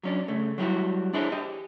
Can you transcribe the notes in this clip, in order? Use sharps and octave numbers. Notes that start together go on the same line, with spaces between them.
F#3 C#4 D4
C#3 A3
F#3 G3 E4 F#4
D4 E4 G#4 C5 C#5
G4 D#5